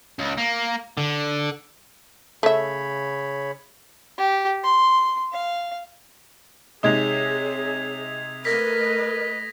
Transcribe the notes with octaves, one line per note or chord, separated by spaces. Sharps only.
C#2
A#3
D3
C#3 A3 C#5 E5 B5
G4
C6
F5
C3 G#3 D#4 G#4 C#5 D#6 G#6 F7
A3 A#4 B4 D#5 A#6 B6